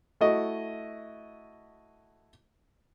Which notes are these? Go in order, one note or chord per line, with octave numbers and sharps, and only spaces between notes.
A3 E4 F#4 D#5